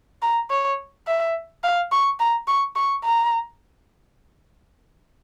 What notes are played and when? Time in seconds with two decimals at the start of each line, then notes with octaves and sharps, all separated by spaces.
0.22 A#5
0.50 C#5
1.07 E5
1.63 F5
1.92 C#6
2.19 A#5
2.48 C#6
2.75 C#6
3.04 A#5